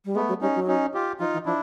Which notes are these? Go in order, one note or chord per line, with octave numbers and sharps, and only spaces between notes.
G3
G#3 A3 B3
F#3
G3 C#4 D#4
F#3
C#4 D#4
F4 G4
F3 D#4 F4
E3
F3 D4 E4